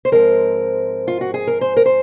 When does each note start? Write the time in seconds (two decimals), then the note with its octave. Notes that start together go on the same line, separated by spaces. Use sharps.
0.05 C5
0.12 G#2 F3 G#3 C4 A#4
1.08 F4
1.21 F#4
1.34 G#4
1.47 A#4
1.61 C5
1.77 A#4
1.86 C5